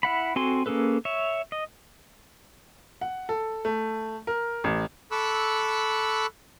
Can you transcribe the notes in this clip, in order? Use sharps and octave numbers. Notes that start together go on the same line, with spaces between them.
E4 F#5 B5
C4 F#4 A4 G#5 C6
A#3 C#4 G#4 A4 B4
C#5 E5
D#5
F#5
A4
A3
A#4
A1
A4 B5 C#6 D6 E6 F#6